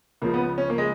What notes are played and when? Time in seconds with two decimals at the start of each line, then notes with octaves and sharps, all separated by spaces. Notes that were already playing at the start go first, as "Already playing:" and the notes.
0.22 C#2 C#3 F3 A#3
0.34 B3
0.58 C#4
0.70 A#3
0.78 G#3